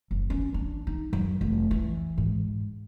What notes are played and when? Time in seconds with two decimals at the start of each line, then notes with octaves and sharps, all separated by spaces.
0.11 F#1
0.30 C#4
0.54 D4
0.87 D#4
1.13 F#2
1.41 F1
1.71 E3
2.18 G#2